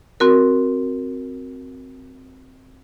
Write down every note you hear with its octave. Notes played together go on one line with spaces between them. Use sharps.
C4 F#4 A#4